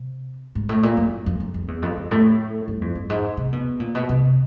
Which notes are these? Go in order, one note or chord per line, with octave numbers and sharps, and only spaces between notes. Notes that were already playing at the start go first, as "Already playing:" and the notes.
Already playing: C3
G#2
A2
A#2
F#2
F2
F2
F2
E2
F2
F#2
A2
G2
F2
G2
G#2
C3
B2
A#2
B2
C3